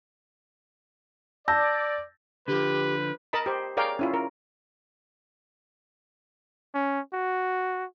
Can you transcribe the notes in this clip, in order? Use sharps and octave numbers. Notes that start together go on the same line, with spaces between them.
D5 A5 E6 G6 A#6
D3 F3 G4 B4
A#4 D#5 A5 B5
G4 C5
G#4 A#4 C#5 D5 F5 G5
C#4 E4 F4
A#4
C#4
F#4